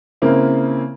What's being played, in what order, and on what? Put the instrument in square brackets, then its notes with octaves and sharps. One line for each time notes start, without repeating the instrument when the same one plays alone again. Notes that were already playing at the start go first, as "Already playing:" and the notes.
[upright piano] C#3 A#3 C4 E4